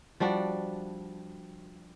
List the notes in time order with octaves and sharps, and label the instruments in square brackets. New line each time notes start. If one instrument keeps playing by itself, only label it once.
[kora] F3 G3 D4 F#4